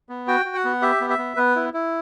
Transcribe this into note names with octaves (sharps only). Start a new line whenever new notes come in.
B3
F#4 G5
F#4
F#5
B3
G4 E5
B3
E5
B3
B3 B4
E4
E4